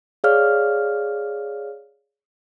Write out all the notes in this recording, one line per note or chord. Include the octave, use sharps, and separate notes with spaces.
G#4 C#5 D5 F5 F6